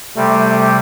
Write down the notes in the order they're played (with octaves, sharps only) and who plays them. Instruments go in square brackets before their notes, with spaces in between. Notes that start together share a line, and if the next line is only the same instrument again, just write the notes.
[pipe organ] C3 G3 [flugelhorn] A3